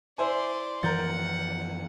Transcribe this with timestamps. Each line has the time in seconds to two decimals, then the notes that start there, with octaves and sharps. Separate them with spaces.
0.18 E4 C5 D5 G#5 C6
0.83 F#2 E3 F3 A#4 F#5 G6 A6